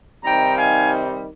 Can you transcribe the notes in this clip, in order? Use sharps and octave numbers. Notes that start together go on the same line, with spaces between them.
C3 D#3 G3 C4 D#4 G5 A#5
F5 G#5